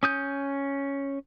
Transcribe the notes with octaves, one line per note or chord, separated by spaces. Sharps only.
C#4 D#6 G6